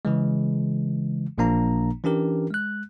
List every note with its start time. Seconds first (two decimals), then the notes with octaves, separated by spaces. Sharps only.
0.05 C#3 E3 G#3
1.38 A1 A#2 F3 A#3 D4 A#5
2.04 E3 C#4 D4 G4 A#4
2.50 G#3 F#6